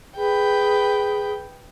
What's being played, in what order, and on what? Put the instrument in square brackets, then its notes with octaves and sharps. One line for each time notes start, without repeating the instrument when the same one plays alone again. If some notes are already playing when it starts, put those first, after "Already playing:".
[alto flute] G#4 [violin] B4 G5